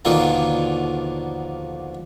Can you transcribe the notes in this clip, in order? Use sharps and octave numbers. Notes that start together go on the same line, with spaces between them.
D#2 B2 D3 D#3 F3 A#3